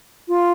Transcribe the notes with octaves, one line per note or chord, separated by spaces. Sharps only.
F4